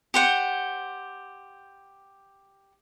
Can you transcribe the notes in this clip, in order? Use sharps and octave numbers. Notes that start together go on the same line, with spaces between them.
G4 C5 F#5